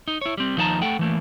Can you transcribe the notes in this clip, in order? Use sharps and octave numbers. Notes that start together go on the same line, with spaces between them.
D#4
E4 C#5
G3 C4
D#2 F3 D#4 A#4 A5 A#5
A3 A4 F#5 G5
E3 A3 A#3